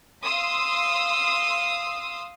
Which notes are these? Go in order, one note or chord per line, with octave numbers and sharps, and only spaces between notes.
F5 C6 D#6 E6